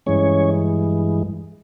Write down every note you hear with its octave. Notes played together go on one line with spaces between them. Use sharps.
G2 E3 G#3 C#4 C#5